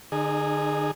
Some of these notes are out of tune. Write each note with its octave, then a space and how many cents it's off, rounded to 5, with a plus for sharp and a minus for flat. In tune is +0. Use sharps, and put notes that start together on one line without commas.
D3 +35 D#4 -30 G#4 +0